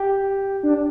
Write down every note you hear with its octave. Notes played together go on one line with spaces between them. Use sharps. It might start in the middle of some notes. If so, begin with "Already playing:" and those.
Already playing: G4
D4